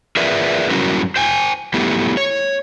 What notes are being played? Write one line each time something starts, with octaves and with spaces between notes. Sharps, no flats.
F4 G#4 A#4 B4 D5 E5
F#3 G3 C#4 E4 F#4 A#4
C5 G5 G#5
G3 A3 B3 E4 G4
C#5